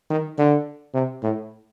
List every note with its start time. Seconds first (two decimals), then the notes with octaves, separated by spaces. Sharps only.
0.10 D#3
0.38 D3
0.95 C3
1.23 A2